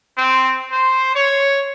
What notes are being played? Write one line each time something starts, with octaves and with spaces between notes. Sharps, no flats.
C4
C5
C#5